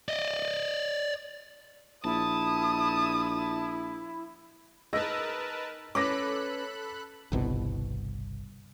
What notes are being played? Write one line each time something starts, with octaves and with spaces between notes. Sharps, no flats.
D5 D#5
A#1 E4 A5 D#6
D#4 G#4 A#4 B4 D#5 A5 E6 A#6
C#4 A4 B4 B5 D6 F#6 A#6
G1 C2 B2